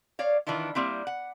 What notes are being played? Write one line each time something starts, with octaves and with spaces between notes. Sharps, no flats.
C#5 D5 F5
D#3 E3 D4 E4 F4
G3 A#3 C4 E4
F#5